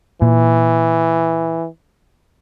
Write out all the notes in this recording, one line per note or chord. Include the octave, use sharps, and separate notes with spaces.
A#2 E3